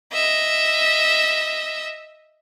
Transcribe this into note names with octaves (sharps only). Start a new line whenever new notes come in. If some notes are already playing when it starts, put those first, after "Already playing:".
D#5 E5